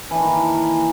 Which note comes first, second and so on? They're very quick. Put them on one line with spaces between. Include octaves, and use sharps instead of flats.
E3 D4 D#3 A#3